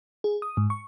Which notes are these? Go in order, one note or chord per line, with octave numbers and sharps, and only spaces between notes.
G#4
D#6
G#2
C#6